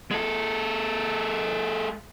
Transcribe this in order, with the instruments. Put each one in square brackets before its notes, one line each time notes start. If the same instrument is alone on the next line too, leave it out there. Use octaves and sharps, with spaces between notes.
[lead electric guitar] G#3 A4